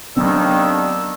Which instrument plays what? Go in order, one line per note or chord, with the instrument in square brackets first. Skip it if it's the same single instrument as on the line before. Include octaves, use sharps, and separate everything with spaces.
[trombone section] D#2 D3 D#3 [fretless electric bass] F#3 B3 C4 [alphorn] D4 [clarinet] E6